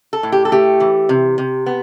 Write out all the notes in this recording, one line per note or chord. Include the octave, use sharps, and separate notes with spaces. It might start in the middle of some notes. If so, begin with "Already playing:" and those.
A4
A2
G4
A4
A3 G4
E3
C3
C3
B3